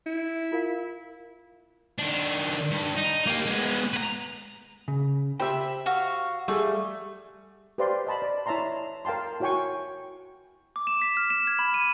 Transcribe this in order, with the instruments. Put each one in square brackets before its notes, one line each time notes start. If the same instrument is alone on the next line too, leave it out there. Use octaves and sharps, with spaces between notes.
[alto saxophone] E4
[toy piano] F4 A#4 F5
[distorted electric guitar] D#3 D4
G2
D#4
A#3 G4
G#3 B3
B4 A#5
[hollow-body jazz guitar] C#3
[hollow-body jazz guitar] G4 C5 G5 [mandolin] E5 B5
[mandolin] F#4 F5
[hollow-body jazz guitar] G3 G#4 [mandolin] A3
[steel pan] G4 B4 C5 D5 F5 C6
D#5 A5 B5
D5
E4 C#5 E5 A5 A#5 C6
A#4 F5 G5 A5 C6
E4 F#4 C#5 G5 G#5 C#6
[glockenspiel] D6
E7
B6
F6
E7
G#6
B5
D#7